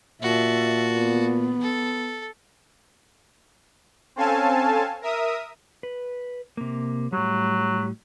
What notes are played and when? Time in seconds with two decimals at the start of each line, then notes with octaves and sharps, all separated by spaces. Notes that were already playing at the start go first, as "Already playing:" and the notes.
0.22 A#2 F#4 E5 A5
0.93 B3
1.61 A4
4.16 C4 C#4 A4 F5 G#5 A5
5.02 A#4 E5 D#6
5.83 B4
6.57 C3 A#3
7.12 A2 F#3 G3